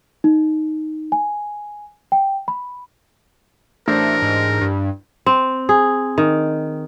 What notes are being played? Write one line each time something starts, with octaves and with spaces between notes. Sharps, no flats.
D#4
G#5
G5
B5
A1 A3 D4 A#4 C5
G#2
G2
C4
G#4
D#3